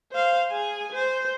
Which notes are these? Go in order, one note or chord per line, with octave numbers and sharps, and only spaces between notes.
C5 F5
G#4 G#5
C5